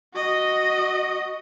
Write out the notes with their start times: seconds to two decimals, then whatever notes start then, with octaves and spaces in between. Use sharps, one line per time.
0.14 F#4 D#5